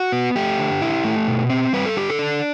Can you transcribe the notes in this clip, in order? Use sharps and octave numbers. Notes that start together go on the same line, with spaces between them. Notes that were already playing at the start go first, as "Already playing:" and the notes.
Already playing: F#4
B3
A3 G4
D3
E4
A3
B2
C4
G3 B4
A4
D3 G4
A4
D4